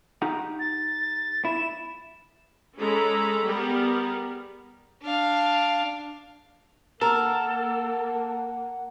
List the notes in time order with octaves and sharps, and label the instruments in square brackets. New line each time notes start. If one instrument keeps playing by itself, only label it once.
[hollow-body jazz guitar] D#4 G4 F#5
[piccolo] A6
[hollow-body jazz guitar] E4 [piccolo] E7
[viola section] G#3 C#4 A4 A#5 B5
G3 B3 G#4 A#4
[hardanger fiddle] D4 F5
[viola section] A#3 [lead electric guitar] A4 [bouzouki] A#4 [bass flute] F#5